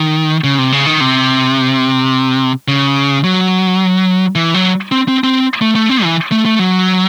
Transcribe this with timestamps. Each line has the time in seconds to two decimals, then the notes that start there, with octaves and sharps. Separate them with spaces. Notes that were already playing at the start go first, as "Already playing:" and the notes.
Already playing: D#3
0.44 C#3
0.58 C3
0.72 C#3
0.86 D#3
1.01 C3
2.68 C#3
3.24 F#3
4.35 E3
4.54 F#3
4.92 C4
5.08 C4
5.24 C4
5.61 A3
5.76 A3
5.89 C4
6.03 E3
6.32 A3
6.46 A3
6.59 F#3